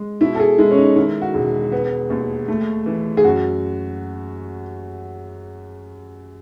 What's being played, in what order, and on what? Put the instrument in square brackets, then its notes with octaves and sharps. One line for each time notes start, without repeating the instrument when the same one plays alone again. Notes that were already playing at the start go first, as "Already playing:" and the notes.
Already playing: [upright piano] G#3
B2 E4
A4
G#4
G#3 E4
C#4
D#4
D#3 E4
F#4
E1
B3
D#2
A3
E3
G#4
F#2 F#4